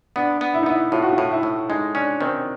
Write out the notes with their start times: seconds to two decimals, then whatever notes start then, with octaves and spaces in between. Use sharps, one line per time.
0.16 B3 D4
0.41 B3
0.54 E4
0.62 D#4
0.66 B3 E4
0.92 A2 F4
1.02 F#4
1.13 F4
1.18 A2
1.31 E4
1.43 A2
1.70 G#3 D#4
1.95 C#4 D4
2.21 D#3 C4